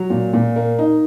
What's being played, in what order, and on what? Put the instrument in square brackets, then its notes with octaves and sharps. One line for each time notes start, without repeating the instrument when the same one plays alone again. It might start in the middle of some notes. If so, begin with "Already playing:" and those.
Already playing: [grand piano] F#3
A#2
A#2
A#3
D#4